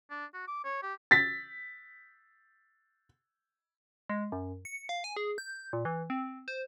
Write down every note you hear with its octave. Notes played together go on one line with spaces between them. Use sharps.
D4
F#4
D6
C#5
G4
A6 B6
G#3
F#2
C#7
F5
G#5
G#4
G6
A#2
E3
C4
C5